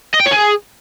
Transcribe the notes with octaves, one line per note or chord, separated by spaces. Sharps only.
D#5
G5
C#5
G#4